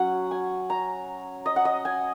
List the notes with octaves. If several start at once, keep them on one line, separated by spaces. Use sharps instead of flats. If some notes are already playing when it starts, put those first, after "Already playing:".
Already playing: F#3 C#4 F#5
G#5
A#5
D#5
F#5
D#5
G#5